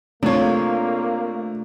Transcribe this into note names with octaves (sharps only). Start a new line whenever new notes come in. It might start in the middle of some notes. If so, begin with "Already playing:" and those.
C3 A3 A#3 D4 F4 C#5